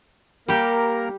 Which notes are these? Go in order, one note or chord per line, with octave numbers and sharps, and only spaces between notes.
G3 A#3 G4 A#4